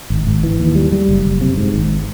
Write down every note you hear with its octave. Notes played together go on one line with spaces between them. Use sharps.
G#1
G#1
E3
D#2
G3
G3
F#1
F#1
C3
G#2
G#1